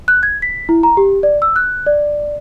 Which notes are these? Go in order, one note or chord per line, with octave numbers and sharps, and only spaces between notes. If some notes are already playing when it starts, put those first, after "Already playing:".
F#6
G#6
B6
E4
A#5
G4
D5
E6
F#6
D5